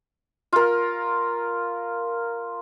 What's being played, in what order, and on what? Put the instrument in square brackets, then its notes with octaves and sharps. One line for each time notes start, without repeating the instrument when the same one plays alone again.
[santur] F4 A#4